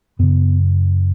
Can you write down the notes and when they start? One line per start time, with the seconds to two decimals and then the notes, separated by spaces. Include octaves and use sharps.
0.19 F#2 C#3 B3